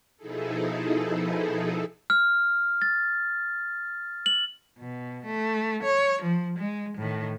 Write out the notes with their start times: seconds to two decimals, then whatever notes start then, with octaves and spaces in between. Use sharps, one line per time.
0.18 B2 F3 D#4 E4 G#4 A4
2.10 F6
2.82 A6
4.26 F#7
4.78 B2
5.25 A3
5.83 C#5
6.22 F3
6.58 G#3
6.98 A2 D#3